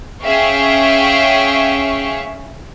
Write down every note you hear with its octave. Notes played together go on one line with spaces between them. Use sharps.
C#4 G#4 E5 F5 G5 C#6